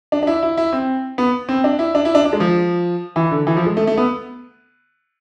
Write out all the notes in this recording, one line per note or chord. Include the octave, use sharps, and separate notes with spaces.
D4
D4
E4
E4
E4
C4
B3
C4
D4
E4
D4
E4
D4
D4
G#3
F3
E3
D3
E3
F3
G#3
A3
A3
B3